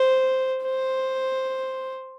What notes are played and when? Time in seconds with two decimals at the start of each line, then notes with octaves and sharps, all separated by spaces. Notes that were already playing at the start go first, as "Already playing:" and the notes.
Already playing: C5
0.65 C5